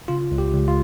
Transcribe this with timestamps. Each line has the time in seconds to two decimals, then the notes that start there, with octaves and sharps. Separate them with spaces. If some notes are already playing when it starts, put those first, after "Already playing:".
0.08 C#3 F4
0.31 C#2
0.38 G4
0.53 C#2
0.68 F4